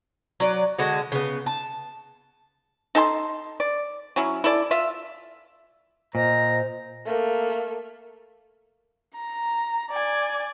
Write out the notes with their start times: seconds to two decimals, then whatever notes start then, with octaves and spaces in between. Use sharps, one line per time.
0.40 F#3 D5
0.78 D3 G#3 F#4
1.12 C#3 B3
1.46 A5
2.95 D#4 A4 G#5 C6
3.60 D5
4.16 F#3 C#4 E4
4.44 E4 A4 D5
4.71 F4 E5
6.15 A#2 C5 D#5 A#5
7.05 A3 A#3
9.16 A#5
9.91 D5 G#5